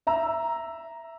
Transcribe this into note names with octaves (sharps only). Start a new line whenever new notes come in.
E5 A#5 E6